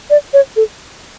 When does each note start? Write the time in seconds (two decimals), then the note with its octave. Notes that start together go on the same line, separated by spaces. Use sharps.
0.10 D5
0.33 C#5
0.56 A4